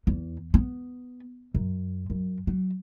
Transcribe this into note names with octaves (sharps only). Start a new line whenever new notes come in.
E2
B3
F#2
F#2
F#3